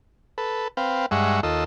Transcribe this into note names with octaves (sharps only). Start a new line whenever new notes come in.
A4 B4
C4 B4 F5 G5
G2 G#3 E5 F#5 C#6
D#2 F4 A4 D#5 E6